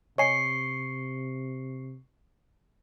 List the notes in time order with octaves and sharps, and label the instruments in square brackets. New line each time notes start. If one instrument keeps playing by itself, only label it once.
[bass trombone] C3 [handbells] C#5 D#5 G#5 [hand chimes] C#6 C7 C#7